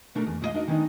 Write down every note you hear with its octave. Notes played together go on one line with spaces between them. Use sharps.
B2 A3 D4 A4 A#4 A#5
E2
E2 A#2 G#3 D#4 D#5 F5
D4 D#4 F#4 A#4 D#5
D#3 G#3 B3 C4 D4 D#4